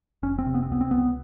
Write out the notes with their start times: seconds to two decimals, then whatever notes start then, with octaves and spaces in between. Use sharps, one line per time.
0.23 F1 C#4
0.39 C4
0.46 C3
0.55 B3
0.63 C4
0.70 C#2 B3
0.81 C4
0.91 C#2 B3